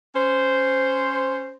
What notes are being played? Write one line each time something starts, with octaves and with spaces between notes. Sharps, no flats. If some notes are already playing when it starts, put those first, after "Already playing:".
C#4 C5